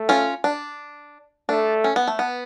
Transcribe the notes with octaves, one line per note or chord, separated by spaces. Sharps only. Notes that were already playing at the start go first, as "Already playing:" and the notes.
Already playing: A3
C#4 F4
D4
A3 D4
C#4
B3
A3
B3